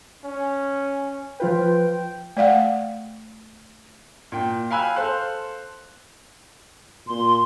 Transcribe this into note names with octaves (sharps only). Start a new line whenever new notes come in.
C#4
F3 F4 B4 G5
A3 D5 F5 F#5
A#2 G5
F5 G5 G#5 B5 E6 F#6
A4 C5 F5 C6 F#6
A#2 C6